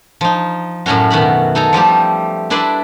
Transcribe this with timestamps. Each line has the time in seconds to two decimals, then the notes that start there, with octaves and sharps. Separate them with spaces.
0.21 F3 D#4
0.86 F#2 A2 A3 C#4 F#4
1.10 B2 D#3 F#4 B5
1.55 D#4 A4 G#5 A#5
1.73 F3 G3 A3 G4
2.50 D4 E4 B4 D5 E5 C6